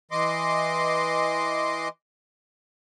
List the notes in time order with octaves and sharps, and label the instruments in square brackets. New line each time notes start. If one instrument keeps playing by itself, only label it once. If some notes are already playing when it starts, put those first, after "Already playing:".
[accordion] E3 D#5 C6 D6